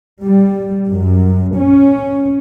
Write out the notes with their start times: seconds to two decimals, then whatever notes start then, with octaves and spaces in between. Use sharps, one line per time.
0.22 G3
0.89 F#2
1.56 C#4